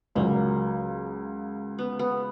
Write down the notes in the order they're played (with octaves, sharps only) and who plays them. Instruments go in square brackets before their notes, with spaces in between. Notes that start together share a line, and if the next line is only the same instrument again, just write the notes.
[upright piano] C#2 C#3 F#3 [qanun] A#3
[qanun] B3
B3